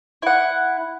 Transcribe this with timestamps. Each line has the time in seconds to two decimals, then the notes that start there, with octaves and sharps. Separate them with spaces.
0.22 E4 F#5